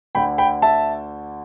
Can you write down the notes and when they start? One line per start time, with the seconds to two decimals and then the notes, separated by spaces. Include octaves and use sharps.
0.15 D2 D3 G5 B5
0.38 G5 B5
0.62 E5 A5